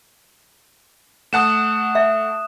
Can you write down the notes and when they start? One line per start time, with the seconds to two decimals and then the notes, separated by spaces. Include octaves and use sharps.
1.33 A3 F#5 A5 D#6 F#6 E7
1.95 E5